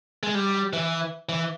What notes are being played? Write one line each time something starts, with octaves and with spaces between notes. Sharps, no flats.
G#3
G3
E3
E3